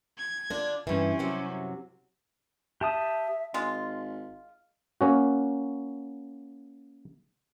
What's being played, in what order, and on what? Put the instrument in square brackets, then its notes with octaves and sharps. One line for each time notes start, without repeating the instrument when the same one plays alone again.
[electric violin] G#6
[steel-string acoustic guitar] D3 D4 F4
[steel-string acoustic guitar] G2 E3 [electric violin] C4 C#4
[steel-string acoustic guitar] F#2 C3 F#3
[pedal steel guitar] G4 A5 D#6 [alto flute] E5
[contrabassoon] G#1 [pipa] G#3 F4
[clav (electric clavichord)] A#3 C#4 F#4